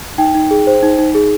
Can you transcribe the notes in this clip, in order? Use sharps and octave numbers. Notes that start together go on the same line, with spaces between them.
D#4 G5
D#4
G#4
C5
D#4
D#4
G#4